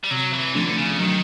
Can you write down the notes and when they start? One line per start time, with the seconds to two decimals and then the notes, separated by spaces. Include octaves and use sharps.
0.04 G3
0.11 C3 F#3
0.33 E3
0.55 D3 F3 A3 D4
0.77 C#3
0.99 D#3 F#3